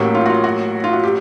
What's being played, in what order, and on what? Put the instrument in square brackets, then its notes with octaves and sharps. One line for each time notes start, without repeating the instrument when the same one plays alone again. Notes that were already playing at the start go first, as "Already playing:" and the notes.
Already playing: [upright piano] A1 A2 F#3 A#3 [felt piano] G4
[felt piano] F4
F#4
F4
F#4
F4
F#4
G4